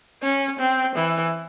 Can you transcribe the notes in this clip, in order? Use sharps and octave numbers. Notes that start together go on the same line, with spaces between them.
C#4
C4
E3